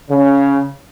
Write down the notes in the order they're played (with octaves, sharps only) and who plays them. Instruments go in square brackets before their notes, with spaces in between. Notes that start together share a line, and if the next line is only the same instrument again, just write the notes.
[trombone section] C#3